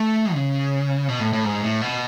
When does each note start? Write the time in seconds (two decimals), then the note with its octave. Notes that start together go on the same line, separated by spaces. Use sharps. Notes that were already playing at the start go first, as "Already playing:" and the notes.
Already playing: A3
0.34 C#3
1.08 B2
1.20 A2
1.33 A2
1.45 G#2
1.63 A2
1.81 B2